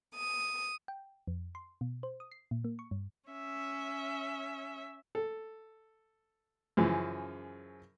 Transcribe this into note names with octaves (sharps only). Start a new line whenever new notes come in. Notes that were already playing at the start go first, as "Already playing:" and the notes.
D#6
G5
F2
C6
B2
C5
D#6
C7
A#2
A#3
C#6
G2
C#4 E5
A4
F#2 C#3 E3 F3